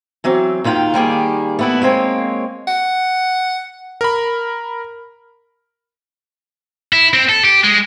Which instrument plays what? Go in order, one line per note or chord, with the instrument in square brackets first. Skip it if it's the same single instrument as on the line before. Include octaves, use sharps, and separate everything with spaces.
[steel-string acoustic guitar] E3 F#3 C4
D#2 D#3 F4 F#5 G5
D#3 G3 A#3 G#4
A3 B3 E4
G#3 A#3 C4 C#5
[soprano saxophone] F#5
[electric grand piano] A#4 B5
[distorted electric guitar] E4
C4
A4
G4
G#3